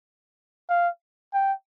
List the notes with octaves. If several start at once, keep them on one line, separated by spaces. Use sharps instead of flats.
F5
G5